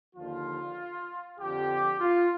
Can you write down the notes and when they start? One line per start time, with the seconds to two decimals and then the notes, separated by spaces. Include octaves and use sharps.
0.16 D#2 D3 F3 F4
1.39 F2 D3 F3 G4
2.00 F4